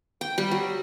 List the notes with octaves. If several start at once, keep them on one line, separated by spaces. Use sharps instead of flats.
G5
G3
F#3